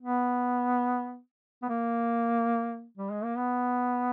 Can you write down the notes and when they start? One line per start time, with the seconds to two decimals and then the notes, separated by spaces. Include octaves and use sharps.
0.01 B3
1.62 B3
1.69 A#3
2.97 G3
3.10 G#3
3.24 A#3
3.37 B3